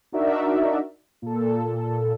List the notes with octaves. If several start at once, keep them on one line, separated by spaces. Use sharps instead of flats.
D4 D#4 F#4 A#4 D5 E5
A#2 A4